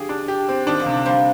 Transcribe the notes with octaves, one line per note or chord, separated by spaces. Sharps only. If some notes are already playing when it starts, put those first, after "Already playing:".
Already playing: D3 F3 G4 G#4
D4
G4
C4
D#3 D4
D3 F3
C3
G3 A#3 C5